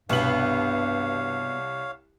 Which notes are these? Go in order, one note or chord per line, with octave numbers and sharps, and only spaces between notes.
C2 G2 B2 B3 C#5 F5 F#7